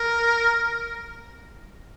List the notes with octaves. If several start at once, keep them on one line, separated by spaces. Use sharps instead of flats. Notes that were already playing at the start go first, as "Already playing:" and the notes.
Already playing: A#4